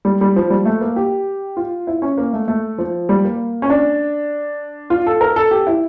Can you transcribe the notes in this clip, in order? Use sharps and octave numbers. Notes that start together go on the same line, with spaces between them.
G3
G3
F3
G3
A3
A#3
G4
F4
E4
C#4
A#3
A3
A3
F3
G3
A#3
C#4
D4
F4
A4
A#4
A4
G4
E4